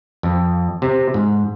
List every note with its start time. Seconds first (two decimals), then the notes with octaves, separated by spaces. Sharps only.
0.23 F2
0.82 C3
1.14 G#2